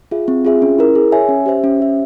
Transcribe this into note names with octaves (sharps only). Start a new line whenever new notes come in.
F4 G#4 E5
C4
F4 G#4 E5
C#4
E4 A#4
G#4
C#5 E5 G#5
C#4
G4 C5 E5
C#4
G4 C5 E5